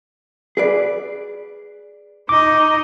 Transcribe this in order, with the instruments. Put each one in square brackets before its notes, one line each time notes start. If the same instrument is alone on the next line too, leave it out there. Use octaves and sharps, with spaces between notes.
[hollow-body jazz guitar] G#4 B4 D5
[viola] D#4 D#5 [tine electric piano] D6